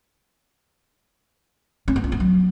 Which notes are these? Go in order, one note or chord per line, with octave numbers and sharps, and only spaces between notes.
C#4
B3
F4
B3
F#3